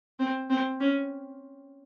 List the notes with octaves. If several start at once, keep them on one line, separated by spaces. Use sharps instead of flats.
C4
C4
C#4